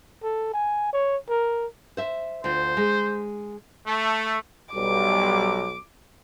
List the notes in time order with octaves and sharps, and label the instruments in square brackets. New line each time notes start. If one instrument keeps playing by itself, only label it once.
[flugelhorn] A4
G#5
C#5
A#4
[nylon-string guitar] C5 E5
[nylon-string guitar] D2 F4 [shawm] C5
[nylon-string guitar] G#3
[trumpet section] A3
[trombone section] B1 [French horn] G3 [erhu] D6